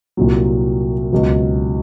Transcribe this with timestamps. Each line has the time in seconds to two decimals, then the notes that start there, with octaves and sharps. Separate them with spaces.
0.17 C2 A#2 F#3
1.12 C#2 B2 F#3